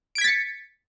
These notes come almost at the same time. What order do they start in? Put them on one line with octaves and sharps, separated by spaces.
D7 G#6 B6 A6 C#7